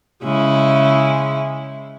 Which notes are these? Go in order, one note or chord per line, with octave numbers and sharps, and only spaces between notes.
C#3 G#3 E4